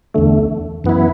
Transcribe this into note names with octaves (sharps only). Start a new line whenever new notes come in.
E2 D3 A3
F#2 E3 B3 E4